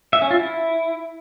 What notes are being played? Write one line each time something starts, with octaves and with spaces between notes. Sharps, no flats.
E5
C#4
F4
E4